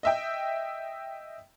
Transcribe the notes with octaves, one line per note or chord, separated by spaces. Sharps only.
D#5 E5 G5